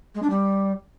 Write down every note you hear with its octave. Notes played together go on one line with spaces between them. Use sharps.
G#3
D4
G3